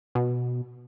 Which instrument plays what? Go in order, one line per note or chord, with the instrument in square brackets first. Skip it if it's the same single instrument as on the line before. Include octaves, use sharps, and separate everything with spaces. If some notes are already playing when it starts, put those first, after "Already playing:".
[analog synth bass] B2